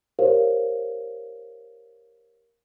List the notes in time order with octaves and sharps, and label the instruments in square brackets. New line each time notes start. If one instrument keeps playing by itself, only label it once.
[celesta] G4 A#4 C5 C#5 F5